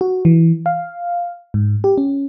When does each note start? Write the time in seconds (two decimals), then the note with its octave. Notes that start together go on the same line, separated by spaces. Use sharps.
0.01 F#4
0.25 E3
0.66 F5
1.54 G#2
1.84 G4
1.98 C#4